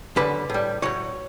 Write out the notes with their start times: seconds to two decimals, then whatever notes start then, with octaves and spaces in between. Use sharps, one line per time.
0.16 F#2 D3 G3 B4
0.50 A2 G3
0.82 A2 F#3 C#5